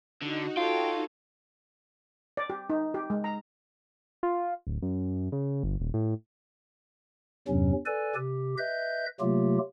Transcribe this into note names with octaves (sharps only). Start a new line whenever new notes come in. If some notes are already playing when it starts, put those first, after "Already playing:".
D3 D#4 F#4
F4 A4 C#5 G5
D5
G4
D#4
G4
G#3
A#5
F4
D1
F#2
C#3
G1
D#1
A2
E2 G2 C3 F#3 C#4
A4 B4 D5 G#5
C3 G4
B4 D#5 E5 G6
C3 F#3 A3 A#3 F4 G4